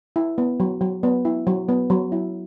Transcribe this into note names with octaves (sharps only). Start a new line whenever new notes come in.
E4
B3
F#3
F#3
B3
E4
F#3
B3
F#3
E4